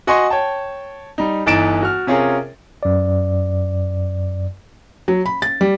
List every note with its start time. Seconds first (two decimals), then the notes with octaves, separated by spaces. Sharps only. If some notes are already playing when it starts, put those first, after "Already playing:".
0.07 F#4 D#5 F#5 G#5 C6 C#6
0.30 C#5 G5 A5
1.18 G3 D#4
1.46 G1 E3 D#4 A6 D7 E7
1.82 F#4 F6
2.07 C3 C#4 F4 G#4 A#4
2.83 F#2 D5
5.08 F#3
5.26 B5
5.42 A6
5.61 G3